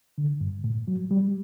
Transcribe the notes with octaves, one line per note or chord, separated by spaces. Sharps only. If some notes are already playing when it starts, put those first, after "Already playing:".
D3
G2
A2
F#3
G3